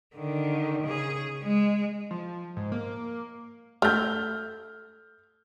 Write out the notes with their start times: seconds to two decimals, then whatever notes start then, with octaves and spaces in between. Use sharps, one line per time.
0.15 D3 D#3
0.83 C#3 G#4
1.43 G#3
2.11 F3
2.57 G#2
2.72 A#3
3.82 A3 F6 G6